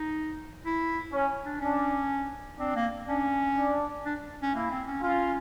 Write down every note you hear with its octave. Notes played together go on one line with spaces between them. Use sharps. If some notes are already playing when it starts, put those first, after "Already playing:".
Already playing: D#4
E4
C#4
D4
C#4 D4
C4 D4
A#3
C#4 D4
D4
D4
C#4
A#3 E4
C4
C#4
C#4 F4